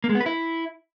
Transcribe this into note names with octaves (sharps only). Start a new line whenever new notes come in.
A#3
G#3
B3
B4
E4